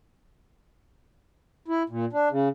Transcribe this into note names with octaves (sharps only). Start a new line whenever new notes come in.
E4
A#2
D4
C#3